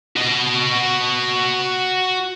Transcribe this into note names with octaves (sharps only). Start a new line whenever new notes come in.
F#4 D#5